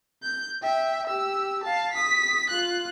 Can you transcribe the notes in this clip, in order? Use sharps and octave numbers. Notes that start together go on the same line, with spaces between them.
G6
E5 G5
G4 E6
F5 A5
D#6 B6
F4 F#6